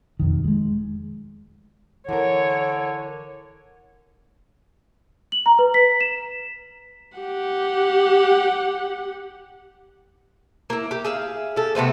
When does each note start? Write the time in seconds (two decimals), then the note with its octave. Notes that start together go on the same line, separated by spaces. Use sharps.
0.20 E1 F2 D#3
0.44 G3 G#3
2.09 D3 E3 A#4 C#5
5.32 F#7
5.46 A#5
5.59 B4
5.74 B6
6.01 E7
7.18 G4 F#5
10.70 A#3 E4
10.91 G4
11.05 G#4 E5 F5
11.56 G4 A4
11.75 C3 A3 B3 C4